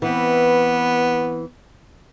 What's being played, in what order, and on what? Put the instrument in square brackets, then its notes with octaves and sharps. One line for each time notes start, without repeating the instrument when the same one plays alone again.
[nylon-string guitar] E3 C4 [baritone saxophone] B3